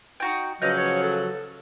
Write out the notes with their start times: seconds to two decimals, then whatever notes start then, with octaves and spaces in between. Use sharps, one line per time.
0.20 D#4 F#4 G5
0.62 C#3 F3 F#3 B3 D#5 F5 G6
0.77 C#5
1.02 A4